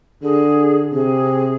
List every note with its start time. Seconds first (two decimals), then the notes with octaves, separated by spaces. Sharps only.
0.22 D3 G#4
0.92 C3 G#4